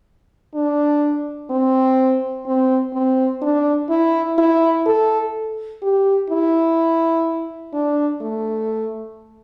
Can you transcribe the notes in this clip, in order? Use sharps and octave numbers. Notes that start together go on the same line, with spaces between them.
D4
C4
C4
C4
D4
E4
E4
A4
G4
E4
D4
A3